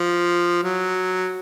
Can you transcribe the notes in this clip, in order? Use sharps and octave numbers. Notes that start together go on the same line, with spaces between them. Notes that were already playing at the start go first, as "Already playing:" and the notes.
Already playing: F3
F#3